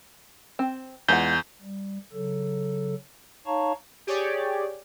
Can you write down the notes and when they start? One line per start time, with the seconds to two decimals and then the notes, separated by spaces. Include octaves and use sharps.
0.59 C4
1.08 E2 G#3 F4 F#5 G6
1.62 G3
2.13 C#3 F#3 A4
3.46 D#4 C#5 F5 A5 A#5 C#6
4.07 G4 G#4 C#5 D5